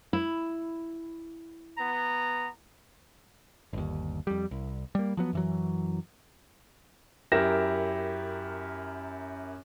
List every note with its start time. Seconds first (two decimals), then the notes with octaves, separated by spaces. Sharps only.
0.13 E4
1.78 B3 A#5
3.73 G1 D#2
4.27 F2 G3
4.51 C2
4.95 G3 A#3
5.17 F3 F#3 B3
5.33 F#2 E3 F#3
7.32 F#2 E4 G4 A#4 A#6 E7